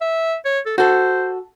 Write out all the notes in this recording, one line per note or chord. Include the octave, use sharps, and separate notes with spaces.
E5
C#5
A4
F#4 A4 C5